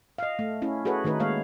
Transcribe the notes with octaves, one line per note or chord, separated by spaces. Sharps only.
D#5 F5
A3
C#4 E4
F#4 G#4 A4 B4 C#5
D#3 A3 D#4 B4
G#3 A#3 C#5 F5